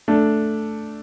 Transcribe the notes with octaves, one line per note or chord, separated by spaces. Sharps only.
A3 D4